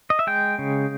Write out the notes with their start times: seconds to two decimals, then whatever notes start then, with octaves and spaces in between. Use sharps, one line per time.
0.10 D#5
0.19 E5
0.27 G#3 G5
0.59 C#3